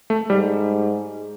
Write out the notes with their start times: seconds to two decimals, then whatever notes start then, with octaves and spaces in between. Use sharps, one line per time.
0.10 A3
0.29 G#2 G3